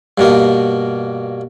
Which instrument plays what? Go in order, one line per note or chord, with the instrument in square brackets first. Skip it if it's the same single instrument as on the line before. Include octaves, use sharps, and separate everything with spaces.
[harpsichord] G2 B2 A#3